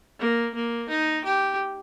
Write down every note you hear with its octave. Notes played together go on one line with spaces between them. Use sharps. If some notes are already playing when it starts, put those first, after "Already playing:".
A#3
A#3
D#4
G4